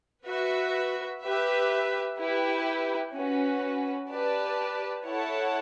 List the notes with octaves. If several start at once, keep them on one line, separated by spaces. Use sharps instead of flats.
F#4 B4 E5
G4 B4 E5
E4 G4 B4
C#4 F#4 B4
G4 B4 D5 A5
E4 A4 C#5 F#5 A5